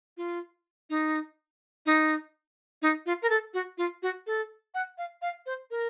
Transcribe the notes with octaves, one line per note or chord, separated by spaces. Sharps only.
F4
D#4
D#4
D#4
F4
A#4
A4
F#4
F4
F#4
A4
F#5
F5
F5
C5
A#4